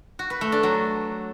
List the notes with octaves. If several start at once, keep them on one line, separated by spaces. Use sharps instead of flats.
F#4
B4
A3
D4
F#3